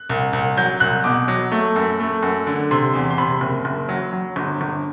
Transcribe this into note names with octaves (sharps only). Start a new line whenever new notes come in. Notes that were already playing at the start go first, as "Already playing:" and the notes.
Already playing: F#6
C2
C2
F#3 G6
C2 F#6
B2 D6
F#3
A3
F#2
A3
F#2
D3
C3 C6
E2 C6
C6
C3 B5
F#1
F#1
F#3
F#3
G1
G1